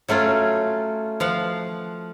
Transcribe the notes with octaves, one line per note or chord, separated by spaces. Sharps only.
F#3 A3 C#4 F4
F3 F5 F#5